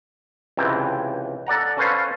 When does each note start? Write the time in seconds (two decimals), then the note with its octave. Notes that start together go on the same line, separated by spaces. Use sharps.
0.57 C#2 C3 E3 G5
1.47 A4 D5 F#5 A#5
1.78 C#4 A4 B4 C5 F5 G#5